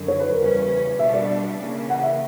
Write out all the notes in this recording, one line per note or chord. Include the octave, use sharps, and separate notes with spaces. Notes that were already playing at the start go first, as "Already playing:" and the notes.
Already playing: F#2 D3 F#3
C#5
B4
A#4
E2 C#3 G3 C#4 B4
B4
B2 G3 B3 D4 E5
D5
C#3 E3 A#3
F#5
E5